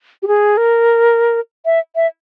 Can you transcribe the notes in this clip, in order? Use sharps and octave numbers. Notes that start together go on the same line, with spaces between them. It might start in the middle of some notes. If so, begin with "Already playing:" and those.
G4
G#4
A#4
E5
E5